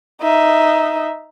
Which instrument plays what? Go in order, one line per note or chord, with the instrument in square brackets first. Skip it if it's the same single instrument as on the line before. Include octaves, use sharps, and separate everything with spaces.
[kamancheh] D#4 E5